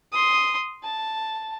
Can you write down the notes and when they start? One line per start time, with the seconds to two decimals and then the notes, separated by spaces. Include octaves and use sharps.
0.12 C6 D#6
0.84 A5